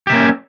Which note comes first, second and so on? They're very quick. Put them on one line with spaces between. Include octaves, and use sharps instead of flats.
G4 E5 A#3 C#4